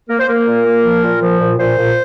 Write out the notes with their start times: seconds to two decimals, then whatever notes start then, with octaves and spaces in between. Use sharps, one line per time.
0.09 A#3 A#4
0.19 C5
0.27 A#3 A#4
0.47 A#2
0.65 A#3
0.84 F3
1.03 A#2
1.21 F3
1.40 A#2
1.58 A#2 C5
1.77 A#2